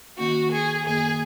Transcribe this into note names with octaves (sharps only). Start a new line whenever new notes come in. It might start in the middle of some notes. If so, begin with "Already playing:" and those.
D#3 A#3 C#4 F#4
G#4
F#2 D#3 A#3 G#4